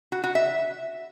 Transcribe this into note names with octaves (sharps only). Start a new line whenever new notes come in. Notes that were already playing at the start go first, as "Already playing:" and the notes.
F#4
F#4
E5